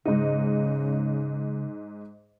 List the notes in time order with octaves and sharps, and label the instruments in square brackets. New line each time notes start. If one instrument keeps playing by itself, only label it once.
[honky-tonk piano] G#2 D#4 [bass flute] C#3